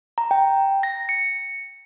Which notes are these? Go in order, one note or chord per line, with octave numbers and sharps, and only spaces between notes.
A#5
G5
A#6
C#7